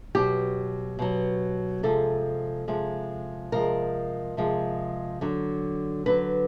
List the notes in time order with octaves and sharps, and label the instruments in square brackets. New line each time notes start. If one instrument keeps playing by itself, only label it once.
[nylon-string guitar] B2 F#3 G4
B2 F#3
C3 F3 G#3 A4
C3 F3 G#3
C3 F3 G#3 A#4
C3 F3 G#3
D3 F#3
D3 F#3 B4